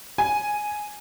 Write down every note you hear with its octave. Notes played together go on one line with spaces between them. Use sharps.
G#5